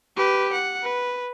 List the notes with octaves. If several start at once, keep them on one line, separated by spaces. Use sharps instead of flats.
G4 B4
F#5
B4